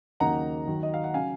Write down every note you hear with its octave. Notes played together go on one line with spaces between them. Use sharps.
D#2 C#3 F#3 A#3 D#4 F#5 A#5
D#2 D#3 F#3
D#5
F5
F#5
C#3 F#3 C#4 F5 G#5